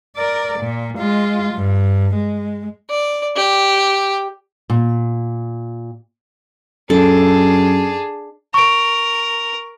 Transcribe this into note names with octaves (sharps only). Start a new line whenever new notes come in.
A#4 D5
A#2
G#3 F4
G2
G#3
D5
G4
A#2
F#2 D4 G#4 A4
A#4 C#6 D7